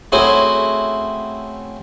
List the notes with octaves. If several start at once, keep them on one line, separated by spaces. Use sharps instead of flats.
A3 C4 C#4 E4 F#4 G#4